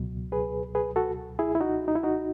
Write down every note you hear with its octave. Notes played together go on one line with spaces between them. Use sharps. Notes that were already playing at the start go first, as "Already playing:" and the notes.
Already playing: C#2 B2 F#3
G#4 B4
G#4 B4
F#4 A4
E4 G#4
E4
D#4 F#4
D#4
E4
D#4 F#4